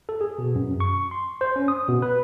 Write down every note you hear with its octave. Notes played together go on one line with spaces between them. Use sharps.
A4
G#4
B2
F#2
C#6
C6
C5
C#4
D#6
B2
B4